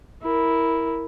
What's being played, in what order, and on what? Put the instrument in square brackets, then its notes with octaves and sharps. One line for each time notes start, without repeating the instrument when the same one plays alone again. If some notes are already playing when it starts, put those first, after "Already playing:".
[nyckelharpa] E4 A#4